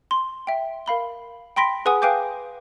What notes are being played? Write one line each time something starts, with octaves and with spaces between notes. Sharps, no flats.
C6
E5 G5
A#4 F5 B5 G7
G5 B5 C6 A#6 B6 D7
G#4 B4 F#5 G#5 D#6
B4 F5 G5 G#5 D6 G6